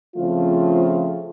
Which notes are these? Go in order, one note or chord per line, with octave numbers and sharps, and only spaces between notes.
C#3 F3 A3 C4 F4